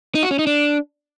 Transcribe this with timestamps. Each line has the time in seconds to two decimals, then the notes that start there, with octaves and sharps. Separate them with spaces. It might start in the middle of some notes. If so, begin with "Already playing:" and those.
0.15 D#4
0.23 F#4
0.31 C#4
0.39 D#4
0.47 D4